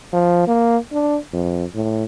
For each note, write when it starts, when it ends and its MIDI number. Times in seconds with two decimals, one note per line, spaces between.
0.13 0.46 53
0.47 0.78 58
0.92 1.17 62
1.33 1.65 41
1.75 2.04 45